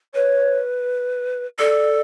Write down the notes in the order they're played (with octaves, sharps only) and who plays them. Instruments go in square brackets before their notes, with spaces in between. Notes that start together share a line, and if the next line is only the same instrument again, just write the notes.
[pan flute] B4 [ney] C#5
[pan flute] A4 [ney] D5